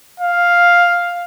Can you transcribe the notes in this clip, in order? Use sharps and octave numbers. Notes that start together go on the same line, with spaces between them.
F5